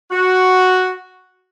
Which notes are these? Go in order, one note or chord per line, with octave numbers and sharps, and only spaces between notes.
F#4